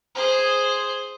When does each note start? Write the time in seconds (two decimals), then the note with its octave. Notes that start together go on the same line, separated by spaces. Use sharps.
0.15 G#4 C5